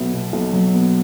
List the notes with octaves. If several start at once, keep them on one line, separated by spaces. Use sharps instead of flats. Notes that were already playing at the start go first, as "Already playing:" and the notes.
Already playing: B1 F#3 B3 E5
B2
B1
F#3
B3